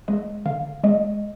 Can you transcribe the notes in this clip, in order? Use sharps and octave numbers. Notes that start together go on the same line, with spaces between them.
G#3 D#5
D3 F5
G#3 D#5